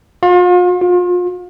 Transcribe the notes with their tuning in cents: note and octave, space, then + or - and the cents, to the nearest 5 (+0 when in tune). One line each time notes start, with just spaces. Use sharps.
F4 +40
F4 +35